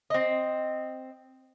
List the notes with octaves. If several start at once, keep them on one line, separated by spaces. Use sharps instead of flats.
C4 D#5